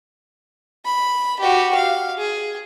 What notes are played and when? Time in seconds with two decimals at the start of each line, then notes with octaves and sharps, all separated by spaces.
0.85 B5
1.40 F#4 G4
1.74 F5
2.19 G#4